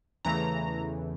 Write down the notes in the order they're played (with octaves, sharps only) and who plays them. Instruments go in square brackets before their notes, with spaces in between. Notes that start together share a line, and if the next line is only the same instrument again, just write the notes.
[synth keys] E2 C#3 E3 A3 A#5